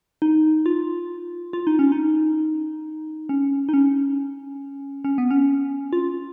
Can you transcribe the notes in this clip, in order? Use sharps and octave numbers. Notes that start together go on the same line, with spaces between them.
D#4
F4
F4
D#4
C#4
D#4
C#4
D#4
C#4
C#4
B3
C#4
F4